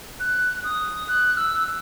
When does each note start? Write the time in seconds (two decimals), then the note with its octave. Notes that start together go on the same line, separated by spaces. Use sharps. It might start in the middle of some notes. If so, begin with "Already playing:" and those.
0.20 F#6
0.64 D#6
1.08 F#6
1.37 E6